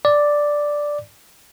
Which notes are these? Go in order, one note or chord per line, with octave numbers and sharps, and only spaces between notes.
D5